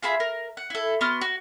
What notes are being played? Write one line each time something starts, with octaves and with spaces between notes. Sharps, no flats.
F4 G#4 E5 B5
A#4
F#5
E4 A4
B3 F#4 C6 F6
F#4